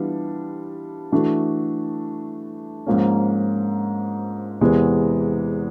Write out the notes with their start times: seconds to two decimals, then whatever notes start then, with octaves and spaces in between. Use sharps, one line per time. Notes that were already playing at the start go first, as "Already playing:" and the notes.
Already playing: E3 G3 B3 D4 F4
1.12 E3 A3 D4 F#4 A4
2.86 G#2 F3 A#3 C#4
4.61 E2 C3 E3 G#3 B3